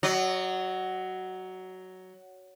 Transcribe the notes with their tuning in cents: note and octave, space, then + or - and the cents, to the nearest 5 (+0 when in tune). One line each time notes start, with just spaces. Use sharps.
F#3 +10 D#5 -35